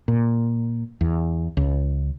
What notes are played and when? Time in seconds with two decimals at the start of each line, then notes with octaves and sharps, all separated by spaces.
0.08 A#2
1.01 E2
1.57 C#2